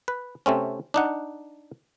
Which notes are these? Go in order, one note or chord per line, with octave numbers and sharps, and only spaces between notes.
B4
C3 A3 C4 C#4
D4 D#4 F#5